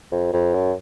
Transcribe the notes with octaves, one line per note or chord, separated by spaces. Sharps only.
F2
F2
F#2